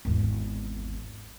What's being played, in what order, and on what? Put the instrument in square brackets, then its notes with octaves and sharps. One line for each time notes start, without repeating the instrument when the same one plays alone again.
[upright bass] G#1 E2